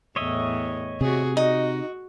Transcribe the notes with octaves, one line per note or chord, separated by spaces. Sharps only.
E2 A2 C#5 D#5 E5
C3 F#4 G#4
D#4 F#4 D#5